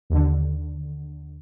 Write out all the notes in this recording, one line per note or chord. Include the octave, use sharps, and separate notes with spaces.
D#2 D3